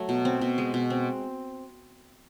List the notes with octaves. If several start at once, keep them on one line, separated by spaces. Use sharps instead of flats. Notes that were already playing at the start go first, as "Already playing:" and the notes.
Already playing: F#3 A3
B2
C4
B2
G#3
B2
C4